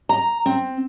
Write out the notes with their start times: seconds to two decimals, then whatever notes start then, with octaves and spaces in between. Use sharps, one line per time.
0.09 A#5
0.46 C4